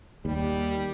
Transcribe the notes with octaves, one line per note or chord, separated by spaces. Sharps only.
D#2 G3